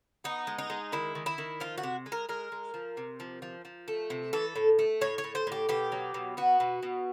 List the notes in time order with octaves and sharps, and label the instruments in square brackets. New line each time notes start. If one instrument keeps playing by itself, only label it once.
[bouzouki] B3 D#4
G#3
D#4
G#3
D#3 E4
D#3
E4
D#3
F3 F4
F#4
C3
G#3
A#4
G#3 A#4
G#3
F3
C3
F3
F3
F3
A3
C3
E3 A4
A2
A3
A2 C#5
C#5
A2
C5
A2 G4
B2 G4
F#3
B2
B3 F#4
B2
B2